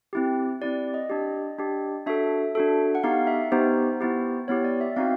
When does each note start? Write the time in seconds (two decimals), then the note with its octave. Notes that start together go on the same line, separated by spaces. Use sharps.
0.13 C4 E4 G4
0.61 C4 E4 G4 D5
0.94 D#5
1.10 D4 G4
1.59 D4 G4
2.06 D4 F#4 A4 E5
2.55 D4 F#4 A4
2.95 F#5
3.03 B3 D#4 G4 F5
3.27 E5
3.52 B3 D#4 G4 C5
4.00 B3 E4 G4
4.48 B3 E4 G4 C#5
4.64 D5
4.81 E5
4.96 C4 D#4 F#4 F5